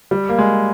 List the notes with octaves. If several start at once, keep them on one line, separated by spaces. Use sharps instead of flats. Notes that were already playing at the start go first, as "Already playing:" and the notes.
G3
A#3
G#3